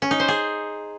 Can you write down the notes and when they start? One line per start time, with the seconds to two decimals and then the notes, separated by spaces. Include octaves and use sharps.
0.02 C#4
0.11 D#4
0.20 C5
0.28 G#4